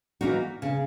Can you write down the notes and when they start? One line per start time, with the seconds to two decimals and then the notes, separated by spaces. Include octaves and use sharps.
0.21 E3 A#3 D#4 F#4
0.62 C#3